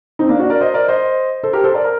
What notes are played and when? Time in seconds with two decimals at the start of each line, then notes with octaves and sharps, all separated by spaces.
0.19 C4 D#4
0.29 A#3 D4
0.40 D4 F#4
0.50 A#4 D5
0.60 C5 D#5
0.74 A#4 D5
0.88 C5 D#5
1.43 A4 C5
1.53 G4 A#4
1.64 A4 C5
1.74 A#4 D5
1.84 A#4